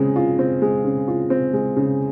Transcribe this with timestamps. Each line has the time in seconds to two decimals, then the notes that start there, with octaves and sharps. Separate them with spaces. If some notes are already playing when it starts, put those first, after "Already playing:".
Already playing: C#3 G#3 C4
0.16 F4
0.39 C4
0.62 G#3
0.84 C#3
1.08 F4
1.30 C4
1.54 G#3
1.76 C#3